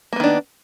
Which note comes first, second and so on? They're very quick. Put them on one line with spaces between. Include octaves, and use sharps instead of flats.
A#3 B3 D#3 D4